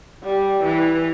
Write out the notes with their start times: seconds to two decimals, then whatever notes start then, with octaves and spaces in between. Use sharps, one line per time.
0.23 G3
0.64 E3